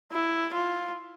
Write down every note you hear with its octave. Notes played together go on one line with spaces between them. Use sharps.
E4
F4